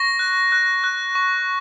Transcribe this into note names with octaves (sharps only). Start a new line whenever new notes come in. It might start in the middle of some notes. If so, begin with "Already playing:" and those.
Already playing: C#6 A#6
F#6
F#6
F#6
C#6